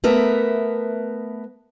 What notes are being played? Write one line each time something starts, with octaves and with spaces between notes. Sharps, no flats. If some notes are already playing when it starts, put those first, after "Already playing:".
A3 B3 A#4 E5